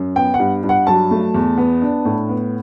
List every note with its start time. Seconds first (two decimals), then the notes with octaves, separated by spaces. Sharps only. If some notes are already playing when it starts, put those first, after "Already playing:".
Already playing: F#2
0.16 B3 G5
0.34 F#5
0.40 G2
0.64 G2
0.69 F#5
0.87 F#3 A5
1.11 A3
1.34 E2
1.58 B3
1.82 D4
2.05 A2
2.29 B3